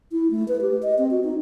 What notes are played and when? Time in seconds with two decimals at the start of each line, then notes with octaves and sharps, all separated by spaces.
0.12 E4
0.31 A3
0.48 B4
0.61 G4
0.82 D#5
0.98 C4
1.11 F#4
1.24 D#4